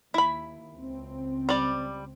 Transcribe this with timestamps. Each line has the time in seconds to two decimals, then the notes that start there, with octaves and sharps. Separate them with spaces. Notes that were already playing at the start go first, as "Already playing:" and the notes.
0.14 D#2 E4 B5
0.75 C#2 C4
1.49 G3 D5